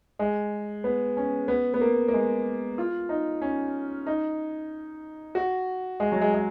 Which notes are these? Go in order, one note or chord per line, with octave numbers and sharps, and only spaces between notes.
G#3
B3
C#4
B3
B3
A#3
A#3
G#3
F4
D#4
C#4
D#4
F#4
G#3
F#3
G#3
G#3